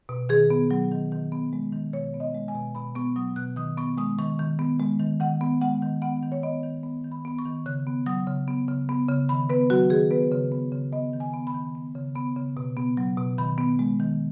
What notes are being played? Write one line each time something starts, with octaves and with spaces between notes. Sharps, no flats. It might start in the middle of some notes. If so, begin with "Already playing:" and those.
B2
D#3 G#4
B3
F#3
D#3
D#3
B3
G#3
D#3
B2 C#5
B3
D#5
G#3
G#5
B2
B2 B5
B3 C#6
F#3 D#6
B2 F#6
D#3 D#6
B3 C#6
G#3 D#6
D#3 C#6
D#3
B3
G#3
D#3
D#3 F#5
B3
G#3 F#5
D#3
B3 F#5
D#3
C#5
B3 D#5
D#3
B3
D#3
B5
B3 B5
C#6
D#3
C#3 F#6
B3
F#3 D#6
C#3
B3
C#3
B3
C#3
D#3 B5
B3 B4
F#3 F#4
D#3 G#4
B3 B4
C#3
B3
C#3
B3 D#5
D#3
G#5
B3
B5
D#3
B3
C#3
B3 B5
C#3
B2
B3
F#3
B2
D#3 B5
B3
G#3
D#3